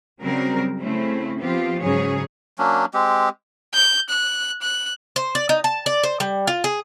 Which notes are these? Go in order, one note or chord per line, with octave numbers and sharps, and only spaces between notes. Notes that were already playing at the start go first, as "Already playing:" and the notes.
C#3 F#3 G3 C4 A#4
C#3 A3 C4 C#4 E4
F3 B3 C4 F4 G4
G#2 C#3 F#3 G#4 C#5
F#3 A#3 C#4 D4
G#3 C4 G4
G6
F#6
F#6
C5
D5
D#4
A5
D5
C5
G3
F4
G#4